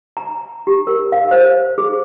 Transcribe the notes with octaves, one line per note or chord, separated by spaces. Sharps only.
A#5
G4
A#4
F5
C5
G#4